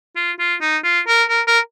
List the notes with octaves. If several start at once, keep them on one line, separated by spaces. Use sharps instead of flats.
F4
F4
D#4
F4
A#4
A#4
A#4